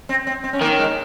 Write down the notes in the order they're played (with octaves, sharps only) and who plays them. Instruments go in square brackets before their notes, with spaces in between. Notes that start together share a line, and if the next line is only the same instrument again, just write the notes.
[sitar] C4
C4
C4
C#4
[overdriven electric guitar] D#3 [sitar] A#3
[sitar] G#3